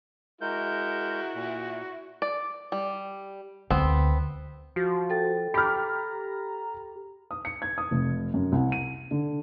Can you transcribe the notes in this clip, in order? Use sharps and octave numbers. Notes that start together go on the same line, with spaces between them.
G#3 E4 F#4 A#4 G6
A#2
D5
G3
D2 B3 C4
F3 F#4
A4 G5 A6
G4 A#5 B5 F6
D#6
C#7
G#6
D#6
F1
F#2
C2
D#7
D3